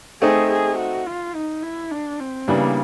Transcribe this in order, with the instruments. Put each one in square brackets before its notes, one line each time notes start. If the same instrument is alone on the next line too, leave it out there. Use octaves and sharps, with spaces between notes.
[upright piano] A3 C4 D#4 [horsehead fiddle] G#4
[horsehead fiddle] G#4
F#4
F4
D#4
E4
D4
C4
[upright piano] C#3 E3 G3 B3 D4 [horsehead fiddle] A#3